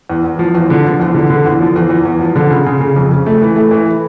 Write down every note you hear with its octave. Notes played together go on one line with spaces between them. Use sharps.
E2
E2
F3
E2
D3
F3
E2
D3
D3
E2
F3
E2
E2
E2
F3
D3
C#3
C#3
C#3
F2
C#3
A3
E3
A3
E3